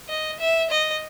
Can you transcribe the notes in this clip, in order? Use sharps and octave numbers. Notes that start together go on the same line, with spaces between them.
D#5
E5
D#5